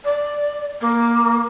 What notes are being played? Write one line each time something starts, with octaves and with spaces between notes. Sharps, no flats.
D5
A#3